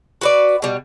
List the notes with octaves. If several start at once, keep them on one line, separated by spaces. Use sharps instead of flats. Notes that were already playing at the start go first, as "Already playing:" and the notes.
F#4 B4 D5
B2 G3